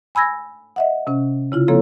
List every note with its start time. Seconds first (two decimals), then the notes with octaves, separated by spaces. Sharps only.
0.15 G#5 B5 E6 G#6 A#6
0.76 D#5 E5 F#5
1.07 C3 C#4
1.52 C#3 E4 F4
1.68 F3 A#3 C4 E4 A4 C#5